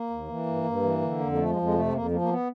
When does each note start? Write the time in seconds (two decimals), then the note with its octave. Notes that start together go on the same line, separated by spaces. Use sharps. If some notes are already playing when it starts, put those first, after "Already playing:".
Already playing: A#3
0.10 D#2
0.28 E3
0.46 G2
0.64 G2
0.82 E3
1.01 D3
1.19 F2
1.32 A#3
1.38 F3 A3
1.49 G#3
1.56 F2
1.62 G#3
1.74 C3 A3
1.92 F2 A#3
2.11 F3 A#3
2.21 A#3
2.29 B3